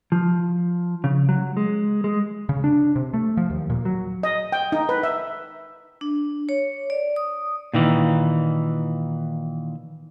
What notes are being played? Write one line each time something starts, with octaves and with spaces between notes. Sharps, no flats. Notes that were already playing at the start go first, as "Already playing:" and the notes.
F3
C#3
F#3
G#3
G#3
C#3
D4
C3
A3
F3
D#2
A#2
F#3
D#5
G5
D#4
B4
E5
D4
C#5
D5
D#6
A#2 D#3 E3